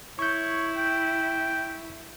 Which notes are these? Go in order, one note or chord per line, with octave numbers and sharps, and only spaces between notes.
E4 C#5 C#6 G6
G5